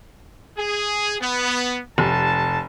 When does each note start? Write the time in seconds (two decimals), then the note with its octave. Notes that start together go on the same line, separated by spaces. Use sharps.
0.57 G#4
1.21 B3
1.98 F1 A5